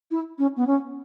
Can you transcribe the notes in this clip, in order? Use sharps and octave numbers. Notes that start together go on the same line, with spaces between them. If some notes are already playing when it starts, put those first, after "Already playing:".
E4
C#4
B3
C#4